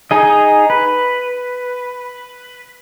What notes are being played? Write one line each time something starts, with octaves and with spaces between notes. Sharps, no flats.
D#4 G#4 D#5
B4